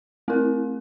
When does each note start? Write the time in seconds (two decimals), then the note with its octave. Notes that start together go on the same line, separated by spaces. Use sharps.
0.28 A3 C4 E4 A#4